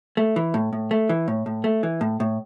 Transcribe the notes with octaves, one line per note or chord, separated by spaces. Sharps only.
A3
E3
A2
A2
A3
E3
A2
A2
A3
E3
A2
A2